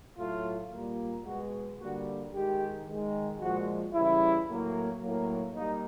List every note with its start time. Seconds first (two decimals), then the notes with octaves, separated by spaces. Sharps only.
0.18 A2 F#3 A3 F4
0.72 A#2 G3 A#3
1.25 B2 G#3 F#4
1.78 D3 G3 A#3 F#4
2.33 D#3 G#3 G4
2.86 D#3 G#3
3.40 A#2 F3 G#3 F#4
3.93 C#3 E3 G3 E4
4.47 A2 F#3 A#3
5.02 A2 F#3 A#3
5.55 G3 A#3 D#4